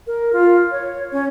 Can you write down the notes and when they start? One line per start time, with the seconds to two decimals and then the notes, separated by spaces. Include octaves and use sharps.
0.07 A#4
0.33 F4
0.71 C#5
1.12 C#4